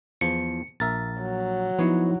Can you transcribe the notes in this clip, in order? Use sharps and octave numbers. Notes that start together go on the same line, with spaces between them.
E2 F3 C#7
A#1 A#4 E5 A6
F#3
F3 B3 D#4 E4 C#5